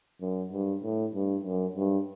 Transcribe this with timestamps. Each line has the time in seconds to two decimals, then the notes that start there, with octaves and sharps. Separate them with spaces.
0.21 F#2
0.52 G2
0.83 A2
1.14 G2
1.44 F#2
1.76 G2